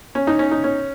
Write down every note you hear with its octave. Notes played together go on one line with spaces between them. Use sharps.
C#4
D#4
C#4
D#4
C#4